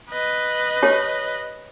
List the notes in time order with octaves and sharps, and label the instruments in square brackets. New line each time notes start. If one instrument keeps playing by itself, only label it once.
[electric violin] B4 D#5
[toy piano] G4 C#5 A5